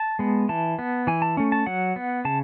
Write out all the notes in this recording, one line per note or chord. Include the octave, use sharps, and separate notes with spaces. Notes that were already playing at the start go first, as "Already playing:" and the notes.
Already playing: A5
G#3 B3
E3 A5
B3
E3 G#5
A5
A3 C#4
A5
F#3 F#5
B3
C#3 A5